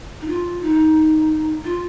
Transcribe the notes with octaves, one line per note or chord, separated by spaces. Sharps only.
D#4
F4
D#4
F4